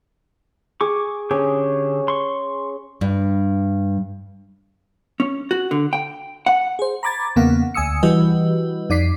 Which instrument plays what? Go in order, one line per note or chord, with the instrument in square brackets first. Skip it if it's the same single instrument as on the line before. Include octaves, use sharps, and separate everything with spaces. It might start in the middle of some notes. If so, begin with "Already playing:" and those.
[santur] G#4 [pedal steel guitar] C#6 D6
[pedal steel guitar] D3 G4 G#4 [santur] C#4
[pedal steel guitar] C6 C#6
[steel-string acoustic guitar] G2
[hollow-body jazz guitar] C#4
F#4
D3
G5
F#5
[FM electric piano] G#4 C5
A#5 B5 D6 G#6 A6
E2 C#3 A#3 B3 F5 F#5
D2 G#5 D#6 E6 C#7
E3 G3 F#4 G4 B4 D#5
F2 D#4 D5 D6 B6 C7